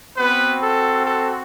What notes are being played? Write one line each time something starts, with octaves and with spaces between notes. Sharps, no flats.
B3 C4 F#4 B4
A4
A4